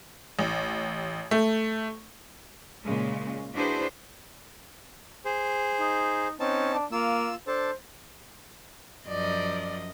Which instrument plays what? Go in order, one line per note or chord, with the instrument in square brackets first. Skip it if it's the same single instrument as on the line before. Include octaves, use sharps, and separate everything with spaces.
[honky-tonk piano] A1
A3
[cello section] A#2 C#3 G#3
D4 E4 F#4 G#4 B4 C5
[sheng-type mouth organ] G#4 C5
[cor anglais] D#4
[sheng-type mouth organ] C4 D#4 A5 [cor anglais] C#4
[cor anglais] D4
[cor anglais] A#3 [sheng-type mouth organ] F4 E6
[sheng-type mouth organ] D4 A4 A5 [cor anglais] C5
[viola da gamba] F#2 F3 D#5 [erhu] D5